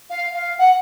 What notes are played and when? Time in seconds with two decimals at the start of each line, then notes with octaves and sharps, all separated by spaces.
0.10 F5
0.34 F5
0.58 F#5